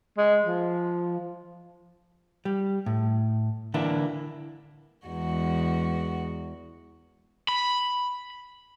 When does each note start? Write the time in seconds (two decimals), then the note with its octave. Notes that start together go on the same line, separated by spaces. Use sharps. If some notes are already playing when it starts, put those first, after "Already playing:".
0.18 G#3
0.45 F3
2.45 G3
2.86 A2
3.74 D3 E3 A#3 D4 E4
5.07 E2 G#3 F#4
7.49 B5